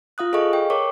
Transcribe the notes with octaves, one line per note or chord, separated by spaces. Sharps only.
F4 F5 D#6 F#6
G#4 A4 D#5 F5 C#6
G5
A#4 C#5 C#6 D6